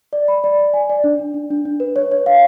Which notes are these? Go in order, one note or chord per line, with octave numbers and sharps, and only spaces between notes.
D5
B5
D5
D5
G#5
D5
D4
D4
D4
D4
D4
B4
C#5
C#5
F5